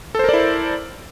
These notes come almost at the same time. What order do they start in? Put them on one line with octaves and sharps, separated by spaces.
A4 C5 A#4 D5 E4